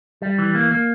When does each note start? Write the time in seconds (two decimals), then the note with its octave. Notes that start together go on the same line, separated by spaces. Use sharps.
0.22 G3
0.39 E3
0.55 A#3
0.71 A#3